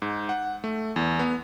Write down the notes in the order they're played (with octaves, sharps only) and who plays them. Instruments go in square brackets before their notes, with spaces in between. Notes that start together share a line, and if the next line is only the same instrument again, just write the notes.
[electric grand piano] G#2
F#5
A3
E2
B3